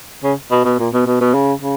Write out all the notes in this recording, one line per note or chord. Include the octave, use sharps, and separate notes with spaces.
C#3
B2
B2
A#2
B2
B2
B2
C#3
C#3